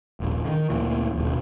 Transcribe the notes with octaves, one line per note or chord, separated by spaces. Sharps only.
D#1 A#1
D3 D#3
D2 A#2 E3
D#1 B1